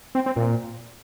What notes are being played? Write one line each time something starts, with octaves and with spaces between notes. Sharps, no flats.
C4
C4
A#2